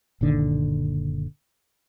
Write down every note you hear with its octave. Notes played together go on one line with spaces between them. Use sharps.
F#1 A#2 D3 D#3